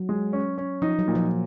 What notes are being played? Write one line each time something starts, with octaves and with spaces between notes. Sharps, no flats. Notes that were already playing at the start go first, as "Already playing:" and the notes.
Already playing: F#3
G#3
C#4
C#4
F3 D#4
F#3
A#2
F3